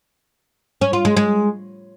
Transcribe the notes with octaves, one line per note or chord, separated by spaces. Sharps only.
C#4
F4
G#3
G#3